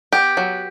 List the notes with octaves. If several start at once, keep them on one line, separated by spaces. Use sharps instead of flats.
B3 G4
F#3